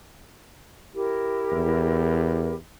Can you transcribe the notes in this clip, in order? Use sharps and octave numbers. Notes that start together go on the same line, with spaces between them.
E4 G4 A#4
E2